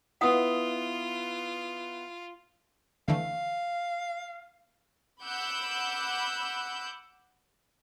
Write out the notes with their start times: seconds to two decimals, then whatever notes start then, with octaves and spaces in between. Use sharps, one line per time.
0.21 B3 E4 F4 F5 F#5 D#6
3.08 D3 E3 A3 F5
5.23 F#5 B5 D6 E6 F#6 G6